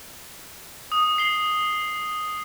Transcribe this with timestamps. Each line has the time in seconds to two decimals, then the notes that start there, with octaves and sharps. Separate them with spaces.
0.92 D#6
1.18 C7 G7